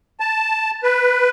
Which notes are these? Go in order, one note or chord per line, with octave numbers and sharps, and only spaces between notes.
A5
B4